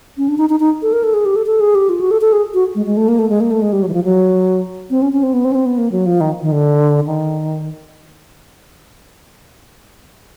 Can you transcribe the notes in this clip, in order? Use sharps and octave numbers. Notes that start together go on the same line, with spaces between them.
C#4
D4
D#4
D#4
D#4
A4
A#4
A4
G#4
G4
A4
A4
G#4
G4
F4
F#4
A4
A4
G#4
F#4
G#3
G#3
A3
A#3
A3
G#3
A#3
A3
G#3
G3
F#3
E3
F3
F#3
C4
C#4
C#4
C4
B3
C4
C#4
C4
B3
A#3
F#3
F3
D#3
D#3
D3
D#3